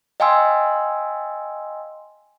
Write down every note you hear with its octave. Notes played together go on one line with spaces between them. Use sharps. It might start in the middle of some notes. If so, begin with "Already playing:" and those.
D#5 F5 G5 G#5 C6 E6